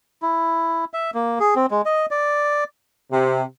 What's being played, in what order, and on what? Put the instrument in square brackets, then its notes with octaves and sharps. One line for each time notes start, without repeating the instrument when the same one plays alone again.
[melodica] E4
E5
A#3
G#4
C4
G#3
D#5
D5
[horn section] C3